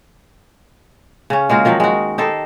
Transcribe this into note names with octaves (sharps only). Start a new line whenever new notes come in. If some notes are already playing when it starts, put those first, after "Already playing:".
C#3 C#4
G#3 A#3 F4 F#4
D#3 F3 F#3 D#4
G#3 F#4
D#4 G4 A4 C5